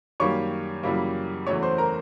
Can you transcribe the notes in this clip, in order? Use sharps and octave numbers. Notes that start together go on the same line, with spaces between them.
F#2 D#3 G3 A#3 C#5 C#6
F#2 C#3 E3 G3 A#3
E2 C#3 F#3 A3 C#5 C#6
C5 C6
A#4 A#5